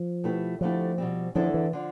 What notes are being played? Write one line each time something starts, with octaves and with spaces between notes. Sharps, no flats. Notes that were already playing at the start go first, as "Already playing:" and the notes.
Already playing: F3
B2 A3 E4 G4 B4
D2 D3 F3 A3 E4 G4
B2 G3 C4
E2 D3 F3 A3 E4 A4
E3
D3 F3